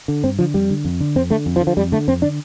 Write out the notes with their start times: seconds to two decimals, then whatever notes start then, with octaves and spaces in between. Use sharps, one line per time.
0.08 D3
0.23 G2 C4
0.39 D3 F3
0.54 F2 G3
0.70 D3
0.85 F2
1.01 D3
1.16 F2 C4
1.30 D3 A3
1.46 F2
1.56 F3
1.61 D3
1.67 F3
1.77 F2 G3
1.92 D3 A3
2.08 F2 C4
2.22 D3 D4